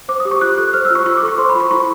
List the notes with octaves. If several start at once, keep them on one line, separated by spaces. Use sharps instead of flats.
C5 D6
D#6
G4
C#6
F4 F#6
A4 F#6
C5 F6
E6
F4
C#6
F4 C#6
D6
A4
C#6
C5 C6
B5
F4 C#6
E4 C#6